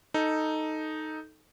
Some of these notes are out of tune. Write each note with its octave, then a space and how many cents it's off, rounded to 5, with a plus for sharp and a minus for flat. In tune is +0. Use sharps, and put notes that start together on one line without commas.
D#4 +0 A4 +0